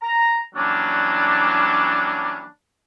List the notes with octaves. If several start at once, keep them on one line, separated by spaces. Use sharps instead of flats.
A#5
E3 F#3 G3 A#3 C#4 D4